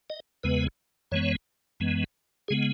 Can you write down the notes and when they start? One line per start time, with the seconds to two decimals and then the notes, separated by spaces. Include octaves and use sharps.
0.10 D#5
0.43 E2 C#3 G#3 B3 B4
1.11 F#2 E3 G#3 B3 C#5
1.80 F#2 E3 G#3 B3
2.48 C#3 G#3 B3 G#4